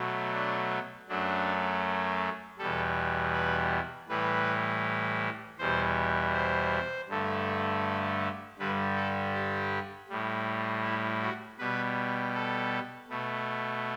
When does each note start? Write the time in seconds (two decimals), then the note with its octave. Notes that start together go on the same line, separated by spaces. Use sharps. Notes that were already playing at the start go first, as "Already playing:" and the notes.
Already playing: B2 F#3 A3
0.34 D4
1.09 F#2 F#3 A3 D4
2.58 E2 B2 G3 A4
3.33 B4
4.09 A2 E3 G3 B4
5.59 E2 B2 G3 C5
6.34 C5
7.09 G2 D3 A3
8.59 G2 D3 G3 B4
8.96 A4
9.34 G4
10.09 A2 G3
10.84 E4
11.22 F#4
11.59 B2 G3 B4
12.34 A4
13.09 B2 A3